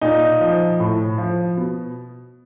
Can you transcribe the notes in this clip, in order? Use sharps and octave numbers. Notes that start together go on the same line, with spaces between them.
A#2 D#4
F3
A2
F3
B2